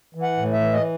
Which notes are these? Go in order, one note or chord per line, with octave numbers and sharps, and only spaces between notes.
E3
F#5
A2
E5
E3
D#5